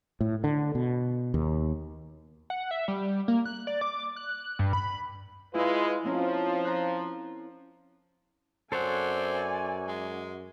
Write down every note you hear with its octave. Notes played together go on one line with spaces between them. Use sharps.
A2
D3
B2
D#2
F#5
E5
G3
A#3
F#6
D5
D6
F#6
G2
B5
G#3 E4 F4 B4 D#5
F3 C4 C#4 A#4
A#5 F#6
F#2 C4 A4 C#5 D5 F#5 G#5
G#3